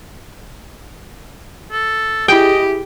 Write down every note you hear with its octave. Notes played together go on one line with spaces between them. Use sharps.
A4
E4 G4 G#4 D#5 G5